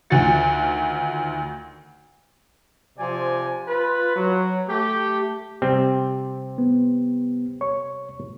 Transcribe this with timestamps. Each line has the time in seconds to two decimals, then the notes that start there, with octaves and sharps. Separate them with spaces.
0.10 D2 D#3 F4 F#4 A6 C#7
2.99 C3 F3 C4 D5 G#5
3.68 F4 B4
4.16 F#3
4.68 A3 G4
5.62 C3 G3 C4
6.58 B3
7.61 C#5 C#6